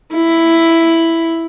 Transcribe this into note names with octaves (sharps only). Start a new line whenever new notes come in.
E4